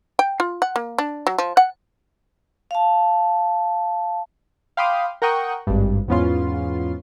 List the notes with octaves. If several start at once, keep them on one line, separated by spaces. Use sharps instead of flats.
G5
F4
F#5
A#3
D4
F#3
F3
F#5
F5 A5
F5 G5 B5 C6 D6 D#6
A#4 F#5 G5 C#6 D#6
G#1 G2
E2 G#2 B3 C#4 F4 C6